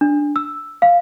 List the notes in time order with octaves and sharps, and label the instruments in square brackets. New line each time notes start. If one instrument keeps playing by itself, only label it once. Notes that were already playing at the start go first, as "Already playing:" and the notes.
[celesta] D4
E6
F5